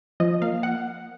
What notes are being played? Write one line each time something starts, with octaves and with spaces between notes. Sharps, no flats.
F3 D#5
A#3 F5
F#5